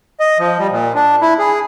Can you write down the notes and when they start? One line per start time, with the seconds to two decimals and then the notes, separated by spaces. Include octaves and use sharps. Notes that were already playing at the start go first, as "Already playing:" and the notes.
0.20 D#5
0.39 F3
0.59 G3
0.71 A#2
0.95 D4
1.22 E4
1.39 G#4